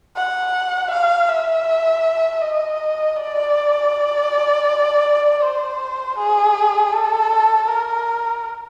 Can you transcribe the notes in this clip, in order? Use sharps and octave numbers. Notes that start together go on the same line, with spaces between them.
F#5
F5
E5
D#5
D5
C5
G#4
A4
A#4